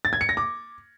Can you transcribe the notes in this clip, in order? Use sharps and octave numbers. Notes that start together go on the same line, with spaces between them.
A6
G#6
C#7
A#6
D6